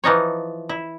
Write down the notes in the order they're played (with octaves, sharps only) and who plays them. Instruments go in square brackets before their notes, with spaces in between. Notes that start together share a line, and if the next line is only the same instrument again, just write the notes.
[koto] E3 F3 D#4 C#5
E4